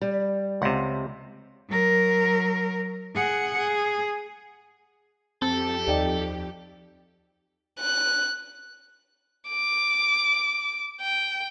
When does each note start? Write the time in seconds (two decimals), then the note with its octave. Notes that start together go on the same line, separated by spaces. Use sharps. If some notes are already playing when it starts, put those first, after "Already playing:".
0.01 G3
0.62 C#2 C3 F#5
1.69 F#3 A#4
3.15 G#4 F#5
3.58 G#4
5.42 F2 C4 G4 A4
5.88 D#2 D#4 D5 G5
7.80 F#6
9.50 D6
11.01 G5